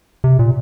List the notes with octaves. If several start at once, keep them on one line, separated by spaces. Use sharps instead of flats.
C3
A#2